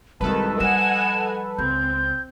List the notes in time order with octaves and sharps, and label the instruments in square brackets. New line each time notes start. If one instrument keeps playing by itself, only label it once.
[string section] C2 D#3 [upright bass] G#3 F4 [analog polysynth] A4 B4 [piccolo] A5
[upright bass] F3 G3 [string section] D#5 F#5 G#5 [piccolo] E7
[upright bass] C#2 [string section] C4 [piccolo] G6